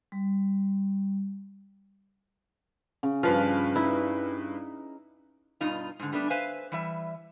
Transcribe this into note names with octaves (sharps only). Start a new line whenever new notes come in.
G3
C#3
G2 F3 B4 F6
D#4 E4
G2 B2 D#4 F4
G#2 D3
G3 A3 B3 D4
B4 C5 E5 F5 G#5
E3 G3 E5